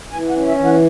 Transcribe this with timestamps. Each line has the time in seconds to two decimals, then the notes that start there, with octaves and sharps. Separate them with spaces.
0.12 E3 G#5
0.30 F#5
0.36 C#4
0.47 E5
0.58 E3
0.65 F#5